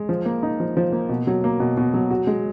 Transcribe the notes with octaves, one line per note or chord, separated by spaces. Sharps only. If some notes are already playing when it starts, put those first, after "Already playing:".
Already playing: G#3
F3
A#3
D#4
F3
F3
A#3
B2
F#3
A#3
B2
B2
F#3
F#4
G#3